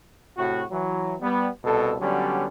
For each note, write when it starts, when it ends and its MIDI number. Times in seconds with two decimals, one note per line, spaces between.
0.37 0.63 45
0.37 0.63 48
0.37 0.63 66
0.71 1.14 52
0.71 1.14 54
1.21 1.48 55
1.21 1.48 59
1.64 1.94 36
1.64 1.94 47
1.64 1.94 69
2.00 2.45 50
2.00 2.45 54
2.00 2.45 55
2.00 2.45 59
2.00 2.45 61